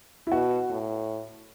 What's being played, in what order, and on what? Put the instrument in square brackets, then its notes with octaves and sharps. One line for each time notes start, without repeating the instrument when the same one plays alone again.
[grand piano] E4
[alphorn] B2 [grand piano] F#4
[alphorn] A2